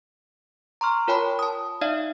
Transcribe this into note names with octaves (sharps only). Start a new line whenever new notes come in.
A#5 C6 C#6 F6
F4 A#4 C#5 G5 A5 B5
A5 D#6
D#4 D5 E5 F5